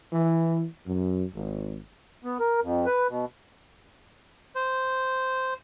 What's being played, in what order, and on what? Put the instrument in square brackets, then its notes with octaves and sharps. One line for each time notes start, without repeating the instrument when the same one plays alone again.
[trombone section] E3
F#2
G#1
[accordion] B3
A#4
F2
B4
B2
[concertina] C5